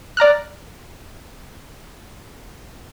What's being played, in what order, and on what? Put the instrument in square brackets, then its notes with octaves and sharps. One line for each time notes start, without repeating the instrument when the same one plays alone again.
[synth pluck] D5 A#5 F6 F#6